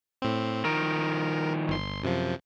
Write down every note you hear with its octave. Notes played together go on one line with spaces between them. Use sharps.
A2 C4
D#3 F3 A#4
G1 C6
F#2 C3 F3